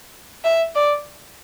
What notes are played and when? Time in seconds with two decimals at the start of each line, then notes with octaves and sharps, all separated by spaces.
0.44 E5
0.75 D5